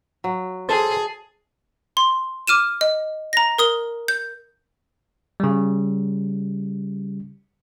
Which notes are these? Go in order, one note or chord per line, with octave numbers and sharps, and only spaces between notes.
F#3
G#4 A4 C5 G#5 A5 A6
C6
D6 F6 D#7 E7
D#5
A#5 A#6
A#4 D#6 G7
G6
C#3 G3